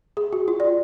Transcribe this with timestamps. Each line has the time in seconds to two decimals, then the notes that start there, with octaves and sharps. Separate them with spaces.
0.17 G#4
0.33 F#4
0.48 F4
0.60 D5